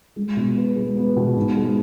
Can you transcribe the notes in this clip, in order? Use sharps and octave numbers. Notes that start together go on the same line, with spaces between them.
G#3
B2
B3
G#3
B3
B2
G#2
G#3